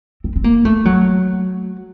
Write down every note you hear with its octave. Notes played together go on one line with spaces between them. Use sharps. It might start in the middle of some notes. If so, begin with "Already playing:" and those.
C4
C4
A#3
A3
F#3